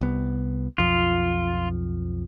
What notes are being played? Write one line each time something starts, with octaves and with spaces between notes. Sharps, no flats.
C2 B3
B1 F2 F3 F4